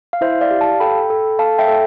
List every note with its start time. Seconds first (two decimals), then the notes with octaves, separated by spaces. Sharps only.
0.13 F5
0.21 E4 C5 E5
0.41 D5 F5
0.51 G4
0.61 F5 A5
0.80 A4 G5 B5
1.10 A4
1.39 A4 F5 A5
1.58 E5 G5
1.68 A4